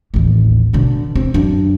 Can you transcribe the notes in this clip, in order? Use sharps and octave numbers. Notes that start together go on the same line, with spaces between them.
A1 D#2
B2 D3
C4
F#2 D4